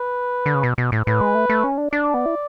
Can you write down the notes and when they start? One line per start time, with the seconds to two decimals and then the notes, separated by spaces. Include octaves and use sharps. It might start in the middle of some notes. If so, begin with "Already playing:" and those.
Already playing: B4
0.46 D3
0.55 C#3
0.63 B2
0.78 B2
0.92 A2
1.07 A2 B4
1.21 G#3
1.35 A3
1.50 A3
1.64 C#4
1.78 D4
1.92 D4 D5
2.14 B3
2.26 E4